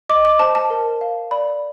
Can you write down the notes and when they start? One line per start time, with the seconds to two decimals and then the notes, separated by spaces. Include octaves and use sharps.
0.09 D#5 D6
0.25 D6
0.39 C5 A5
0.55 A5
0.70 A#4
1.01 F5
1.31 D5 B5